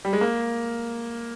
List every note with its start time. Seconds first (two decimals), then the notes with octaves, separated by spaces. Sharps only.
0.05 G3
0.13 G#3
0.21 A#3